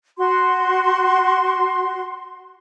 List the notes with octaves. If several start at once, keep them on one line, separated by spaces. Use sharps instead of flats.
F#4 C6